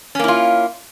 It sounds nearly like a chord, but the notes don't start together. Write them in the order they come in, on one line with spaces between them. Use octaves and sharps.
C#4 A#3 E4 F4